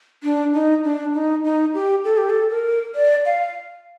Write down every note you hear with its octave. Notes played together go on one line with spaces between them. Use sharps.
D4
D#4
D4
D#4
D#4
G4
A4
G4
A4
A#4
D5
F5